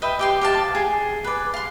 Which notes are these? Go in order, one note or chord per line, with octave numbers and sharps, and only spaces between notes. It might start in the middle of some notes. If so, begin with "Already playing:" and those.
B4 D#5 E5 G5
G4 G5 C6
G4 F5 A5
G#4
B4 D5
F5 C6